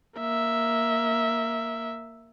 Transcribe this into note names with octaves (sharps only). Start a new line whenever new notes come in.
A#3 E5